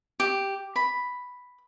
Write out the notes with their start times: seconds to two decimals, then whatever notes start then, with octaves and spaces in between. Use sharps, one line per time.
0.20 G4
0.76 B5